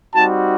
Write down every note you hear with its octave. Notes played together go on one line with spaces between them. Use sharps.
G3 C4 D#4 F#4 A5